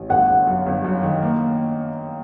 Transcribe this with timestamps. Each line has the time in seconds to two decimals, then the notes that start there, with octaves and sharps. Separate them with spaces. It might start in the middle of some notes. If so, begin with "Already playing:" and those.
Already playing: A1
0.09 G1 F#5
0.28 G1
0.47 F#2
0.66 G1
0.84 F#2
1.03 D#3
1.22 A#3